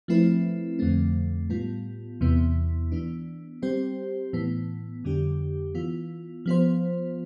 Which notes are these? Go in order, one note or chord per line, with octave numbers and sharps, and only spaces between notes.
F3 A3 C4 E4 B4
F2 D3 F3 A3 C4
A2 G3 B3 F4
E2 C3 E3 B3
E3 B3 D4
G3 C4 G4 C5
A2 E3 B3
F2 D3 G3 D4 G4
E3 B3 F4
F3 B3 F4 C5